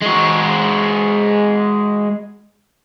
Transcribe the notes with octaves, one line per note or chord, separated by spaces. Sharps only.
G#3 F#4